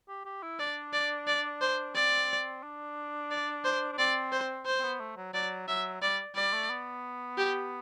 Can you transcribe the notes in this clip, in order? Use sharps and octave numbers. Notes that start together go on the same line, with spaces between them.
G4
G4
E4
D4 D5
D5
D5
C5
C4 D5
D4
D5
C5
D4
C4 D5
C5
C5
C4
B3
A3
F#3
F#3 D5
F#3 E5
G3 D5
G3 D5
A3
B3
G4